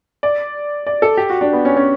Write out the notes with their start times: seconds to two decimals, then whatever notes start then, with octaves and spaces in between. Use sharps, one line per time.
0.23 D5
0.87 D5
1.02 A4
1.17 G4
1.30 F#4
1.41 D4
1.53 B3
1.65 C#4
1.77 C#4